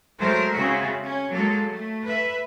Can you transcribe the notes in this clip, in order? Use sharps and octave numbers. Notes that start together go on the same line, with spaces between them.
F#3 G#3 A3 A#4 C5
C#3 C4 F#4 E5
C#4
F#3 G#3 A#3 A4
A3
B4 E5